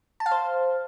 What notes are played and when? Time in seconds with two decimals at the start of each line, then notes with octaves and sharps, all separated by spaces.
0.20 A5
0.26 F5
0.31 C5